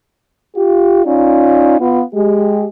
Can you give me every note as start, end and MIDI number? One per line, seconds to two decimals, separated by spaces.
0.56 1.03 65
0.56 1.03 67
1.06 1.78 61
1.06 1.78 63
1.06 1.78 65
1.06 1.78 74
1.81 2.02 59
1.81 2.02 65
2.15 2.66 56
2.15 2.66 67